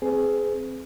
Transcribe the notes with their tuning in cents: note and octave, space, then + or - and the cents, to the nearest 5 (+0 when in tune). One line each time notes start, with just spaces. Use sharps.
C4 +0 G#4 +15 B4 +40